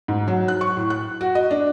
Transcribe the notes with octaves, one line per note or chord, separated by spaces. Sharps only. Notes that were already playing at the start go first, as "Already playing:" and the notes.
G#2
F#3
F#6
C#6
A2
F#6
F#4
D#5
D4